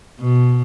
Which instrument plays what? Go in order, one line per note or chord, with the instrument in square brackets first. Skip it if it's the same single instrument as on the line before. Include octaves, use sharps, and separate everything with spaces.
[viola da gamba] B2